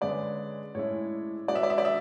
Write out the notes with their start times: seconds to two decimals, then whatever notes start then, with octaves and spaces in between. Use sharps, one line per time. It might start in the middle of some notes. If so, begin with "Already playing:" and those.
0.01 D3 G#3 C#4 G#4 B4 D5
0.75 A2 G#3 C#4 E4 C#5
1.48 G#3 C#4 F#4 B4 D5
1.55 E5
1.63 D5
1.70 E5
1.78 D5
1.85 E5